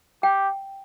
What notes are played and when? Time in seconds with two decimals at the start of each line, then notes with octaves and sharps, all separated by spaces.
0.23 G4 G5